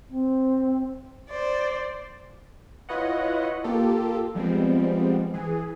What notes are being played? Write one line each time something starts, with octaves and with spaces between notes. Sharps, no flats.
C4
C5 D5
E4 F4 B4 C#5 D#5 F#5
A#3 F4 G4 A4
F3 G3 G#3 B3 C4
E3 G#4